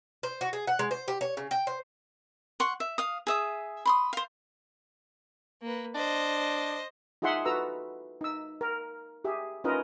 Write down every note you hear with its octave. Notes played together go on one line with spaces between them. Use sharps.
C5
F#4
G#4
F#5
G#3
C5
G4
C#5
C#3
G5
C5
F#5 C6 C#6
E5
F5 D#6
G#4 E5 D#6
B5 C6 D#6
C5 F5
A#3 B4
D4 C5 D#5
D#4 F4 G#4 E5 F#5 C6
F#4 A4 B4 A#5 E6
D#4 E6
A#4
G4 G#4 E5
C#4 D#4 F4 A#4 B4 D#5